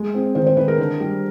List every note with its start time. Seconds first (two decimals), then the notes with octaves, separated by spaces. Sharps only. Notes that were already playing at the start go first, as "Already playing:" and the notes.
Already playing: G#3
0.15 C4
0.35 D#3 C5
0.47 C5
0.57 D#3 B4
0.68 A#4
0.78 D3
1.00 G3